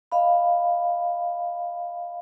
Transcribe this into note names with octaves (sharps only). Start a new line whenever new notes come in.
D#5 F5 B5